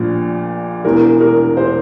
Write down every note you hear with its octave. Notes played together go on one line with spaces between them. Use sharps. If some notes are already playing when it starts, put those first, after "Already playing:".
Already playing: A#1 A#2 F3
E1 E2 E3 A#4
A#4
C5